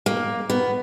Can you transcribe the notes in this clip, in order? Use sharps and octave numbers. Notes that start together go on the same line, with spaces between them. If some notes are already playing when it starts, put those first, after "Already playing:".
A#3
B3